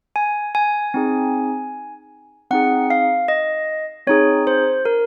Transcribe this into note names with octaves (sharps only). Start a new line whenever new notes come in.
G#5
G#5
C4 D#4 G#4
C4 D#4 G#4 F#5
F5
D#5
C4 D#4 G#4 C#5
C5
A#4